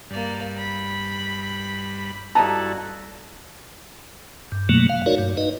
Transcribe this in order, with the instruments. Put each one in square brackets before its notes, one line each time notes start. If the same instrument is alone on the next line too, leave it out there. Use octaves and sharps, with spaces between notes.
[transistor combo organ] G2 [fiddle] A#3 D5
[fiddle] B5
[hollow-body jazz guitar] G2 D#5 A#5 [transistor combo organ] E4 F#4 A4 [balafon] A5
[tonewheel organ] G2
F#2 B2 F#3 A3 A#3
F5
D#4 F#4 A#4 C#5 D5
G2
D#4 B4 D#5